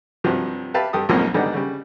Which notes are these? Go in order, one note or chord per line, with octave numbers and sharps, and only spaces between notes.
G2 C3 F3 F#3
G4 B4 E5 F5 A5
G2 G4 A4 D#6
B1 F2 G#2 F3 A#3 C#4
G#2 D3 G3 B3 D4 D#4
C#3 G3